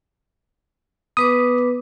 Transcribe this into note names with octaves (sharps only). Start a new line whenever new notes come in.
B3 B4 D6 D#6